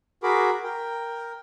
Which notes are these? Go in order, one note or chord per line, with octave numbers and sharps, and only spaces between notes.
F#4 G#4 A#4 B5 D6
A#4 G5